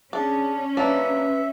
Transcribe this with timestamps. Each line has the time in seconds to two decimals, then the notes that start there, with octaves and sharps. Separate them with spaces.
0.13 C#4 D4 G#4
0.77 F#3 A#3 D4 B4 E5